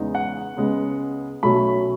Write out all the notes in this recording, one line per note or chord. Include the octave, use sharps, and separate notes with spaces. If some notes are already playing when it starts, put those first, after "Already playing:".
Already playing: E2 C#3 G#3 B3 D#4
F#5
C#2 C#3 G#3 B3
B1 B2 F#3 A3 C#4 B5